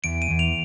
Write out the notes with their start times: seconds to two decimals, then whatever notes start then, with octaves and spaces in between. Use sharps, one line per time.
0.04 E2 D7
0.22 D#7
0.30 E2
0.39 F7